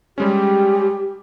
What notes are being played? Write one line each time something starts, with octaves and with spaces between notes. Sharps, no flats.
G3 G#3 C#4 G4